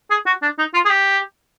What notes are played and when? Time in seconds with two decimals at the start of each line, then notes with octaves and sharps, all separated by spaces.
0.10 G#4
0.26 F#4
0.42 D4
0.58 D#4
0.74 F4
0.85 G#4
0.89 G4